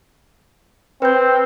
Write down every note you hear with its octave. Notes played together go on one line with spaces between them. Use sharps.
C4 B4 G6